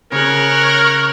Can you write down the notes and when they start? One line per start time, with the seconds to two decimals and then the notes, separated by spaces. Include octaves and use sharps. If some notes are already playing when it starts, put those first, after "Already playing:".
0.12 C#3 G#4 A#4 C#5 F#6